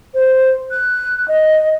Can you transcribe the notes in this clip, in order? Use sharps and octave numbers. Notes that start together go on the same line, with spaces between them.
C5
F#6
D#5